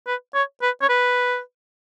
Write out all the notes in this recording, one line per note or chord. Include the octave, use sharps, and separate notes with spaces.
B4
C#5
B4
C#5
B4